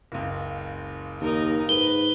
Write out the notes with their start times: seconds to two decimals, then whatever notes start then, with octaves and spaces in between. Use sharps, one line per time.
0.12 F#1 C#2
1.21 D#2 D#4 A#4
1.69 G#2 B4 G7